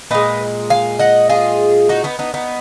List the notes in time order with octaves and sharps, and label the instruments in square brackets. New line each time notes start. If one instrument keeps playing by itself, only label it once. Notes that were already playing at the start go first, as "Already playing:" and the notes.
[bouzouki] A#2 G#3 B4 D#5
F5 G#5
D#5 F#5
F4 G#4
D#4 F#4
B3 D#4
B3 D#4
B3 D#4